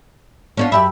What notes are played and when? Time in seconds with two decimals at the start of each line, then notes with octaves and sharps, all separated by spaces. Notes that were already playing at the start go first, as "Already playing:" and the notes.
0.57 B3 C#4 D4 F4
0.72 F#2 G4 E5 B5